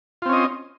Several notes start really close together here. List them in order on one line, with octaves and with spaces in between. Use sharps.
F4 C4 C#4 D#5